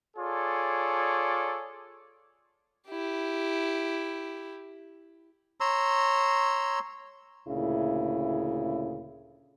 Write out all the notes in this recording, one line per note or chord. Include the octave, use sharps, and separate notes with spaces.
F4 G#4 A4 C#5 D5
E4 G4
C#5 A#5 C6 E6
D2 A#2 C#3 E4